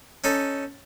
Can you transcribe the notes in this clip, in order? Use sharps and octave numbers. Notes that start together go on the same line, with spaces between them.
C#4 D#4 A4